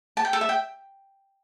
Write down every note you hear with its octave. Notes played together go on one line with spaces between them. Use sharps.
A5
G5
A4
E5
G5